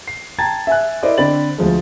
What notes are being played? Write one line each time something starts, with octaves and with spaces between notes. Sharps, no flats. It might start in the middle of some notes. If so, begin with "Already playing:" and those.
C7
G5 A5 A#5 G#6 A6
E5 G#5 F#6
E4 A#4 C5 D5 D#5
D3 C4 D5 B5 A6 F#7
D2 F3 G#3